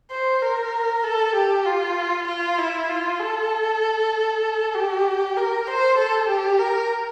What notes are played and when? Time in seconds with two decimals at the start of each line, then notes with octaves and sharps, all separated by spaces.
0.11 C5
0.42 A#4
1.04 A4
1.35 G4
1.65 F4
2.27 F4
2.58 E4
2.89 F4
3.20 A4
4.74 G4
5.36 A#4
5.67 C5
5.98 A4
6.28 G4
6.59 A#4